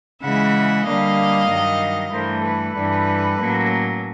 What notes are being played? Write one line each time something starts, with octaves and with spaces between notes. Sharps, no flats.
C#3 E3 G#3 E5 F#5
D3 G3 A#3 D#5 F5
G2 D#3 F#3
G2 E3 A3 A#4 C5
A4 B4
G2 E3 G3
A2 F#3 A#3 C#4